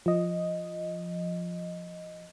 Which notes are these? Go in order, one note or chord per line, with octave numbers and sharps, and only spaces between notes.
F3 D#5